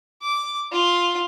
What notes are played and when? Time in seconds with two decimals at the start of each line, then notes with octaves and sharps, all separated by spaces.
0.22 D6
0.72 F4